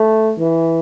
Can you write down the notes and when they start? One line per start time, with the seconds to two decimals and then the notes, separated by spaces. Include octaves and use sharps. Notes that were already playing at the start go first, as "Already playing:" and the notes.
Already playing: A3
0.39 E3